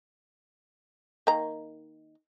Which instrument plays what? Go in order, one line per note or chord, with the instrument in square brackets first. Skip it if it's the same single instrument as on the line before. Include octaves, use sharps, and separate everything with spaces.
[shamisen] D#3 A#3 A#5